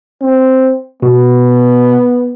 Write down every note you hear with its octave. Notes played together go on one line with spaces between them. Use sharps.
C4
B2 B3